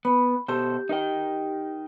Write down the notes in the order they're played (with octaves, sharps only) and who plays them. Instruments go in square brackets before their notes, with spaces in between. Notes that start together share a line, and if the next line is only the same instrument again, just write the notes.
[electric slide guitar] B3 [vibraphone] B5
[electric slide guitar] B2 A4 C5 [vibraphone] G4
[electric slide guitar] D#4 A#4 G5